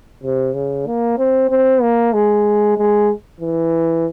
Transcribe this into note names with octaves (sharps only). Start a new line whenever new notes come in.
C3
C#3
A#3
C4
C4
A#3
G#3
G#3
E3